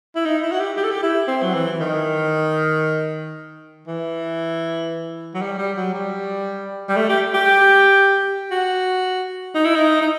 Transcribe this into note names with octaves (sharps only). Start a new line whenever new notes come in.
E4
D#4
E4
F#4
G4
G4
A4
G4
E4
C4
F#3
E3
D#3
E3
F#3
G3
G3
F#3
G3
G3
A3
G4
G4
F#4
D#4
E4
D#4
D#4